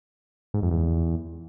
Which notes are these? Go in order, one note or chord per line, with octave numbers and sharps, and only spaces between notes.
G#2
F2
E2